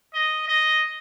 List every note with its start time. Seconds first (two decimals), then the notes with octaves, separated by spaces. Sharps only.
0.14 D#5
0.48 D#5